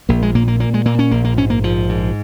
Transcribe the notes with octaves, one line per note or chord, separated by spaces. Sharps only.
A#1 A#3
G#3
A#2 A#3
A#3
A#2 A#3
G#3
A#2 A#3
C#4
A#1 A#3
A#3
G#2 C#4
A#3
A#1 F3
G#2